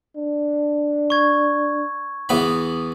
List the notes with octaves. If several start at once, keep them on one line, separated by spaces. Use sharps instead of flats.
D4
C#6 G#6
E2 B3 B5